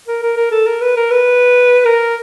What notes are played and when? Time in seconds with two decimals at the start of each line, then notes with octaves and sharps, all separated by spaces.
0.08 A#4
0.22 A#4
0.37 A#4
0.51 A4
0.67 A#4
0.81 B4
0.96 A#4
1.11 B4
1.85 A#4